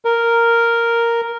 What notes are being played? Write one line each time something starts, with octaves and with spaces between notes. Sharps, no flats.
A#4